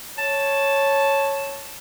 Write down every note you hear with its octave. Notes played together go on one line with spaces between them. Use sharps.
C#5 A5